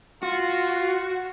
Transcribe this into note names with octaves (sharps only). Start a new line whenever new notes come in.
F4 F#4